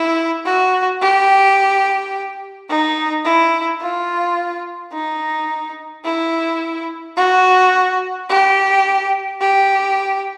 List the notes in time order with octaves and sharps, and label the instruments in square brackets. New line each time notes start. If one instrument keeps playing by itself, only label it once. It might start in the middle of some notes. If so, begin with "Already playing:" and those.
Already playing: [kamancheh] E4
F#4
G4
D#4
E4
F4
D#4
E4
F#4
G4
G4